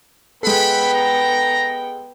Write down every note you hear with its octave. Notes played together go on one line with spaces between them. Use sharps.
G#3 B3 A4 F#5 G5 B5
A#5